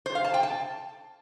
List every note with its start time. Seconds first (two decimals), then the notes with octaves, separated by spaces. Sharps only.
0.06 C5
0.15 F5
0.24 A5
0.34 G5
0.43 A5